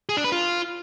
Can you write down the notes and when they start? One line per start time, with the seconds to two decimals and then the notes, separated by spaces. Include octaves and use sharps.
0.09 G#4
0.17 D4
0.24 B4
0.32 F4